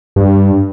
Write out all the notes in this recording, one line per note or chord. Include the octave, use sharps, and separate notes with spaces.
G2